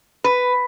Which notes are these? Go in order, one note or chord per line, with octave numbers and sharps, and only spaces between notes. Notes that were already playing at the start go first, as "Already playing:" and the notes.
B4